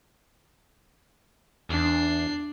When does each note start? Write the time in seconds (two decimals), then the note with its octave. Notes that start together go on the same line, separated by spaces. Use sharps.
1.69 E2 D4 C7